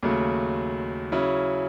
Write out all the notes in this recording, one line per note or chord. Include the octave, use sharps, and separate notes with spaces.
D#2 C#3 F#3 A3
C#3 F#3 C#4 E4